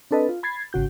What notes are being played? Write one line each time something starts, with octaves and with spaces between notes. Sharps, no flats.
C4 D4 A4 B4 D#5
F4
B5 G#6 A6 C7
G#1 C#3 F#4 G6